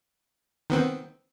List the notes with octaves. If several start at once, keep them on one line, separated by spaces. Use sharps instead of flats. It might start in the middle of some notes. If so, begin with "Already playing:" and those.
D#3 B3 C4